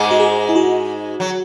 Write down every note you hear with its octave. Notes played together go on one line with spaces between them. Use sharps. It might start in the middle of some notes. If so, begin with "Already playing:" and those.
Already playing: G#2 G#3
F#4
G#4
E4
F#4
F#3